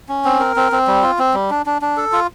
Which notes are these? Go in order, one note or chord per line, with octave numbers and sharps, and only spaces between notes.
C#4
C4
A#4
C4
C4
G3
F4
C4
G3
D4
D4
D4
A4
F4